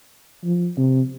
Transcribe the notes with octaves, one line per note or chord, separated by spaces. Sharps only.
F3
C3